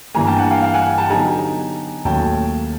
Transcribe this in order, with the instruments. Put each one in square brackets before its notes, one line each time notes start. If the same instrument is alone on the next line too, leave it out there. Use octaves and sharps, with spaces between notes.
[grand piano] G2 E3 G3 A#3 [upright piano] G#5 A#5
[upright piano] G5 A5
F#5 G#5
F5 G5
F5 G5
F#5 G#5
G5 A5
[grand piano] D3 F#3 B3 D#4 G4 [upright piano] G#5 A#5
[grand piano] D#2 D#3 F#3 A3 C#4 [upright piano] G5 A5